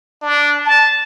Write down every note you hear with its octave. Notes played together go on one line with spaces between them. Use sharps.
D4
A5